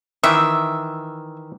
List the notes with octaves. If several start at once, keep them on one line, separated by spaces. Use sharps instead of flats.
D#3 E3 E5